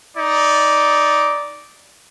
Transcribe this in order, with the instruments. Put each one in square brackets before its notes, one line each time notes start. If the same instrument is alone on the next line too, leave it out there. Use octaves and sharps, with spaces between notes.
[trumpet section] D#4 D5